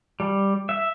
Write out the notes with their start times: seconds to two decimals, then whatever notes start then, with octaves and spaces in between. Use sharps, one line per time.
0.20 G3
0.69 E5